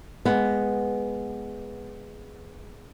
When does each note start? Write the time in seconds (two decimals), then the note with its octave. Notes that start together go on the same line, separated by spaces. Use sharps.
0.25 G#3 B3